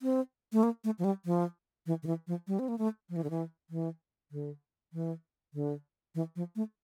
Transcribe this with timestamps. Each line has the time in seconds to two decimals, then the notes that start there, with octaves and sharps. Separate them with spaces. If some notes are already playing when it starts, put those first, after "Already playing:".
0.02 C4
0.53 A3
0.63 A#3
0.84 A3
0.99 F3
1.04 G3
1.25 F3
1.86 E3
2.03 D3
2.07 E3
2.27 F3
2.47 G3
2.59 C4
2.68 A#3
2.78 A3
3.09 F3
3.16 E3
3.24 D3
3.30 E3
3.70 E3
4.31 D3
4.93 E3
5.54 D3
6.15 E3
6.36 F3
6.56 A3